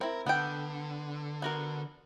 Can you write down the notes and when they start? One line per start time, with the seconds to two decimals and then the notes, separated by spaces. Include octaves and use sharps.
0.01 C4 E4 A#4
0.26 D3 B3 A4 G5
1.42 B3 F#4 A#4